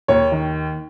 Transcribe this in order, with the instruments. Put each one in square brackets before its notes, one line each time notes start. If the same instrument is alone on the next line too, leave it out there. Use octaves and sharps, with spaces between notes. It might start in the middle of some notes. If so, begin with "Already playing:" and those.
[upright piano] D#2 C#5
D#3